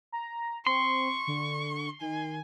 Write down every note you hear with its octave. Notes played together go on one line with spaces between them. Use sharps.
A#5
C4 C6 C#6
D3
D#3 G#5